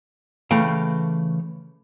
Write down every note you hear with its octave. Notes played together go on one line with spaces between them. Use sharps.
C#3 E3 A3 F5 G5